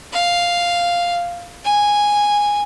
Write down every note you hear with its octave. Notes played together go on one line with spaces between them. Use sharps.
F5
G#5